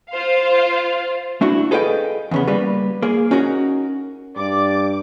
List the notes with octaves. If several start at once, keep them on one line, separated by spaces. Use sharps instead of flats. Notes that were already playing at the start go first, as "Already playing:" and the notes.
F4 C5 F5
A3 D4 E4 F#4
G#4 A4 B4 D#5 F5 G5
E2 C#3 B3
G3 A#3 B4
A#3 G#4
C#4 D#4 F#4 A#4
G2 D5 D6